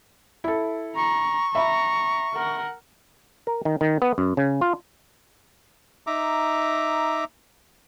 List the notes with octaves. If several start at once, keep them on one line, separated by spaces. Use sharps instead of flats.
E4 A4
A#5 C#6
E5 A#5 B5
A#4 F#5
A#4
D#3
D#3
B3
F#2
C#3
F4
D#4 E5 A#5 D6